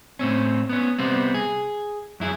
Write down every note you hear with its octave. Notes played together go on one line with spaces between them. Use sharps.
A2 C4 C#4
B3 C#4
C3 G3 B3 C4
G#4
F#2 E4 G#4